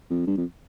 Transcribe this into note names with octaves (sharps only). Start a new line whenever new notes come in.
F2
G2
F2